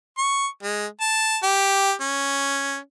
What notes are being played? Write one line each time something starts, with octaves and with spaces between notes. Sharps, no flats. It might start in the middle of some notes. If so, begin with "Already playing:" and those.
C#6
G#3
A5
G4
C#4